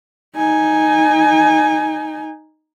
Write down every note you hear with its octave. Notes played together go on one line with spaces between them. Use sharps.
D#4 G#5